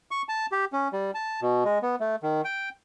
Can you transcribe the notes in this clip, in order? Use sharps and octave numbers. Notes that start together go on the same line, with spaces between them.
C#6
A5
G4
C#4
G3
A5
B2
G#3
B3
A3
D#3
G5